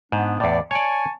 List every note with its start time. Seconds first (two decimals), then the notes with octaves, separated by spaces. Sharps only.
0.12 G#2 B3 D4
0.40 E2 A2 D5
0.71 C#5 D5 G#5 A5 C#6